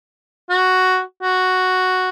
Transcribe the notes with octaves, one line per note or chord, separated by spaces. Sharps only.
F#4
F#4